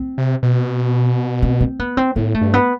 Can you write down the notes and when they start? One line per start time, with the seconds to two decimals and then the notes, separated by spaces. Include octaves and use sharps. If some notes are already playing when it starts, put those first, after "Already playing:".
Already playing: C4
0.18 C3
0.43 B2
1.42 C4
1.61 C4
1.79 B3
1.97 C4
2.16 A2 B3
2.34 A3
2.41 G2
2.54 B3